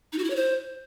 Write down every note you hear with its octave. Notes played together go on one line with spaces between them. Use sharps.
D#4
F#4
E4
C#5
C5